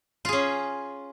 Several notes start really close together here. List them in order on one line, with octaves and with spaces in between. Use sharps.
F4 G#4 C#4